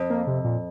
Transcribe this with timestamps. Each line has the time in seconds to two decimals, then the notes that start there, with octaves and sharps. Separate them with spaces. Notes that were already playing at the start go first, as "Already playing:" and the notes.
Already playing: F2
0.10 A#3
0.27 C3
0.44 A#2